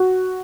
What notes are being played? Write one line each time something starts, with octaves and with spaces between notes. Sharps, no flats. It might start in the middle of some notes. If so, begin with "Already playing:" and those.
Already playing: F#4